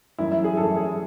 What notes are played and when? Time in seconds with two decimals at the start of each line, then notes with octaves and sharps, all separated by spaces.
0.18 F#2 E3 E4
0.32 E4
0.44 G#4
0.57 F#2 E3 A4
0.77 G#4